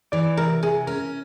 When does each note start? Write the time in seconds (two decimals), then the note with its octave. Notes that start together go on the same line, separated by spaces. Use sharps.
0.12 E3 D5
0.37 C3 A#4
0.63 C3 G#4
0.87 C#4 A#4